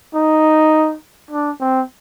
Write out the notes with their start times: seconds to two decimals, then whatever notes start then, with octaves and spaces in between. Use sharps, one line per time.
0.14 D#4
1.31 D4
1.61 C4